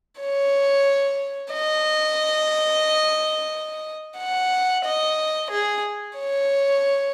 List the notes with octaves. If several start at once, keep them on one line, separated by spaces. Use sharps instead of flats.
C#5
D#5
F#5
D#5
G#4
C#5